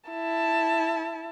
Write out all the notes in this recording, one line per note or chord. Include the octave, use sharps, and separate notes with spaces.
E4 A5